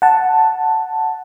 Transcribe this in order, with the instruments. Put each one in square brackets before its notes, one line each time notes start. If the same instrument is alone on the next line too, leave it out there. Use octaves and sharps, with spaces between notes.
[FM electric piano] F#5 A5